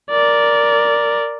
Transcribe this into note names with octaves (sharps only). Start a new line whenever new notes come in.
A#4 D5